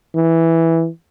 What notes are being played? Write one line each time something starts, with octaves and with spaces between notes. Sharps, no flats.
E3